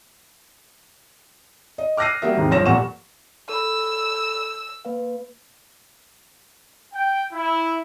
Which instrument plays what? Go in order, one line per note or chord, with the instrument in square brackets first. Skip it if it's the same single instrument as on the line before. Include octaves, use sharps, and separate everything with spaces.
[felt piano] D#5
D6 F6 F#6 A#6 C7 D#7
G3 A#3 F#4 G4 A#4 E5
D#2 G#2 C3
G1 F3 C#5 A#6 E7
F1 A#2 G3 F#5 C#6 E7
[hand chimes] A4 B5 [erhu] E6
[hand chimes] A#3 B4 F5
[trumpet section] G5
E4